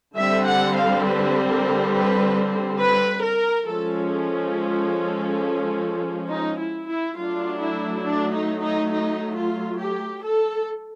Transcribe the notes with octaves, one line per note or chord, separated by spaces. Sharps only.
D3 G3 C4 E5
F#5
F5
B4
A#4
B4
B4
A#4
F3 G#3 C#4 A4
A4
D#4
E4
E4
F#3 A3 D4 F4
E4
D4
D#4
D#4
D#4
F4
G4
A4